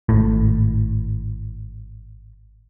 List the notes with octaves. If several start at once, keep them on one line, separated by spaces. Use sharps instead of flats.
G#1 A2